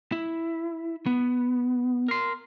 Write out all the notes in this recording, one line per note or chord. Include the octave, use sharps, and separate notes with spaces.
E4
B3
A#4 C6